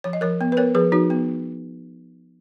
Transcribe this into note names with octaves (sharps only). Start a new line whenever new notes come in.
F3 C#5
D#5
F3 A#4 C#5
B3
B4
B3 A#4 C#5
F3 G#4 B4
F3 D#4 F#4
B3